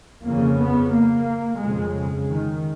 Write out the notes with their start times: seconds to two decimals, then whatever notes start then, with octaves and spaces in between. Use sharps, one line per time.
0.23 F2 C#3 A#3
0.58 B3
0.92 A#3
1.61 F2 C#3 G#3
1.95 G#3
2.30 D#3